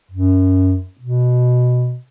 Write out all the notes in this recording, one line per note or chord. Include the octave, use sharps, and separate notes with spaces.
F#2
B2